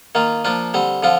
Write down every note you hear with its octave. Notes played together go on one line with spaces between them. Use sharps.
D#3 A#3 F4
F3 A#3 D4 F4
D3 G3 C4
D3 F3 C4 F4